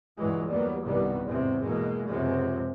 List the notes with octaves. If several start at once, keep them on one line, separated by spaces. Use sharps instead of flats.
C#2 G2 A#2 E3 F#3 G#3
E2 F#3 G3 A#3 B3
C2 G2 B2 D#3 G3 B3
E2 G#2 C3 F#3 G#3 C4
B2 E3 G#3 A#3
C#2 F#2 C3 F3 G#3